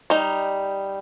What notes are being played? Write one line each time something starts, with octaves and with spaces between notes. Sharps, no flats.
G3 D#4